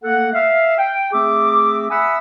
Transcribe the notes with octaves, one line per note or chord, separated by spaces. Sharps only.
A3 A#3 A4 F#5
E5 F5
G5
A3 C4 G#4 E5 D6
E5 F#5 G#5 B5 D#6 E6